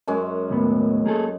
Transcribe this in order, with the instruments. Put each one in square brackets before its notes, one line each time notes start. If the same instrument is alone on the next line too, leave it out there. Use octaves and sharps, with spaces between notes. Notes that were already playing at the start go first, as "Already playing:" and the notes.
[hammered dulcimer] F#2 G#3 C#4
[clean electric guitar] D#2 A2 B3
A#3 G#4 A4